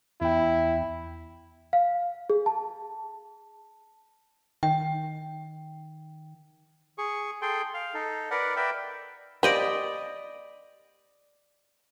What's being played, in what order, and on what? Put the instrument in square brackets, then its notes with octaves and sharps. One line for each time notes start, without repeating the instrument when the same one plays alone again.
[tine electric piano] E2 G5 [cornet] E4
[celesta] F5
G#4
A5
[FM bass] D#3 [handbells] G5
[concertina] G#4 C#6
G#4 A4 G5 C6
F5
D#4 A4
A#4 B4 D5 F#5
A#4 B4 D5 E5 G5
[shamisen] A#3 G4 C5 [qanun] D5 D#5 B5